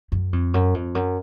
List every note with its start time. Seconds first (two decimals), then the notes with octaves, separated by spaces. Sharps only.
0.12 F#2
0.33 F2
0.54 F#2
0.74 F2
0.95 F#2